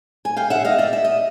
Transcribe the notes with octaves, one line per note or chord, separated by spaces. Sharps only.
G#5
F5 G5
E5 F#5
D#5 F5
D5 E5
E5
D#5